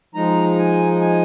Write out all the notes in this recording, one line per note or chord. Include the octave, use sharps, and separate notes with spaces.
F3 G#3 D#4 A#5
G#5
G#5